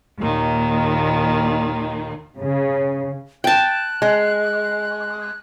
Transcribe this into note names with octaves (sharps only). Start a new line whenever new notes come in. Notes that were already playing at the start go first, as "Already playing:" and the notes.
D#2 A#2 D#3
C#3
G5 A5 F#6
G#3